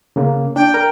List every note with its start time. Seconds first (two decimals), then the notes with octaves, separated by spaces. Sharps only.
0.16 C#3 A#3
0.56 D4 G5
0.74 A#4